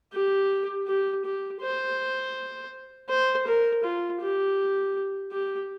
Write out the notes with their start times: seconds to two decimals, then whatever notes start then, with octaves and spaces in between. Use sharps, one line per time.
0.13 G4
0.88 G4
1.25 G4
1.62 C5
3.09 C5
3.47 A#4
3.84 F4
4.21 G4
5.32 G4